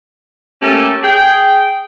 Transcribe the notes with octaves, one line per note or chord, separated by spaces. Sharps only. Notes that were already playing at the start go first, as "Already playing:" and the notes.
A3 A#3 C#4 G4 A4
G#4 G5